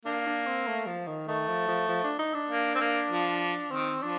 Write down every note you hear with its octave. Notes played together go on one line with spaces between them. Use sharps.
A#3 D4
D4
C4
A3
F3
D#3
D#3 A3
F3
F3
F3
D4
D#4
D4
A#3
C4
A#3
F3
D#3 C4
F3 D4